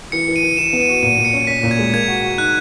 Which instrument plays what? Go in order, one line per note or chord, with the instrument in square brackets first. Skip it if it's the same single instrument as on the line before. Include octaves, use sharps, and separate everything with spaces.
[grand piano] E3 [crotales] C#7
[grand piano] E3
[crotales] D#7
[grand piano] E3
[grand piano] E3 [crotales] E7
[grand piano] B3
[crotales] D#7
[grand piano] F#4
[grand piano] A#2 [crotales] D#7
[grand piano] A#2
[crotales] C#7
[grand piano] C#4
[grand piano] C#4 [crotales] B6
[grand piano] A#2
[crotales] G#6
[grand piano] G#3
[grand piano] A#3 [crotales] G#6
[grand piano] F#4
F#4
[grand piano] D#4 [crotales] F#6